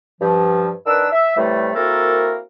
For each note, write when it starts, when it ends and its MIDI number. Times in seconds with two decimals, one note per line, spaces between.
0.21 0.70 43
0.21 0.70 53
0.86 1.06 51
0.86 1.06 62
0.86 1.06 70
0.86 1.06 71
0.86 1.06 88
1.11 1.33 76
1.36 1.70 45
1.36 1.70 48
1.36 1.70 52
1.36 1.70 55
1.36 1.70 57
1.75 2.39 58
1.75 2.39 60
1.75 2.39 64
1.75 2.39 66
1.75 2.39 69
1.75 2.39 70